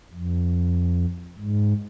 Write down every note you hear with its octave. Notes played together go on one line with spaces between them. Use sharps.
F2
G#2